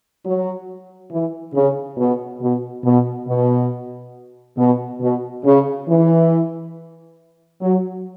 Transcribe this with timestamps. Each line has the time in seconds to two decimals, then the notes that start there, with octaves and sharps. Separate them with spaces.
0.25 F#3
1.12 E3
1.54 C#3
1.98 B2
2.41 B2
2.85 B2
3.28 B2
4.58 B2
5.01 B2
5.44 C#3
5.88 E3
7.62 F#3